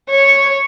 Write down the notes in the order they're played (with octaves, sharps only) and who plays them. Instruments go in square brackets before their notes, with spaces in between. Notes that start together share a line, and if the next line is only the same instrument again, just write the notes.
[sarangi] C#5